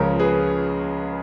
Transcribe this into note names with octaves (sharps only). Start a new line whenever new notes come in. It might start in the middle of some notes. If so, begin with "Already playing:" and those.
Already playing: C#2 C#3 F3 A#4 C#5
G#4 B4